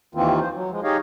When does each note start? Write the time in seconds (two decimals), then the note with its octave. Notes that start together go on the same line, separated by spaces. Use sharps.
0.15 D#2 D#3 E3 A#3 C4 F4
0.40 F3 C5
0.54 F#3
0.71 F3 G#3
0.84 D#4 G4 G#4 C#5 D#5 F5